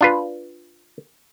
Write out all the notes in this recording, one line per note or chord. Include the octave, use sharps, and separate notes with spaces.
D4 F4 B4